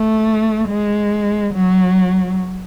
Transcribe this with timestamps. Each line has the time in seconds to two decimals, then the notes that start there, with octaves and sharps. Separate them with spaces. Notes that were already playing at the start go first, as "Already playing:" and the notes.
Already playing: A3
0.69 G#3
1.54 F#3